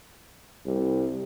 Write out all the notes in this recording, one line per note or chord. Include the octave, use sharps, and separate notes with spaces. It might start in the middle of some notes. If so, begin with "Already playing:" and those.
C2